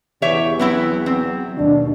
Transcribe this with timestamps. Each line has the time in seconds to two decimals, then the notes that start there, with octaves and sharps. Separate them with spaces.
0.22 E2 E3 G4 C#5 E5
0.59 F#3 B3 C4 E4
1.06 C4
1.57 D#2 B2 D4